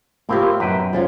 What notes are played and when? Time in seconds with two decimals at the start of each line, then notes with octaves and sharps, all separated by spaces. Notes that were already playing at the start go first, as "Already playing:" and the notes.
0.29 A2 A#3 C4 E4 F4 G4
0.60 F#2 B2 D#4 B4 G5
0.93 B1 F3 C#4 F4 D5